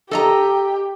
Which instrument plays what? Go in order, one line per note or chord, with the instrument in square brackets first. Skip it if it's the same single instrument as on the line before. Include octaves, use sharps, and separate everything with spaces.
[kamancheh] G4 [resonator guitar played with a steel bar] A4 D#5 A#5